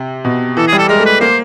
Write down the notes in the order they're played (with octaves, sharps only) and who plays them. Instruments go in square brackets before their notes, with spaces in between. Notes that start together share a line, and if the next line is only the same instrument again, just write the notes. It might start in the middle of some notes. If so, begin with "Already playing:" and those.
Already playing: [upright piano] C3
B2
[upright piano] E3 [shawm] A4
[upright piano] G3 [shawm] G#4
[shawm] A4
[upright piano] G#3 [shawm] A#4
[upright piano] A3
[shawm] B4
[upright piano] A#3 [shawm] C5